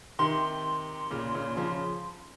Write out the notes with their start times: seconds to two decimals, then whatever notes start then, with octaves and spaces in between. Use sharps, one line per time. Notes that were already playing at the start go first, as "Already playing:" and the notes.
0.19 C3 D#3 C6
1.11 A#2 C#3
1.34 A#2 C#3
1.57 C#3 F3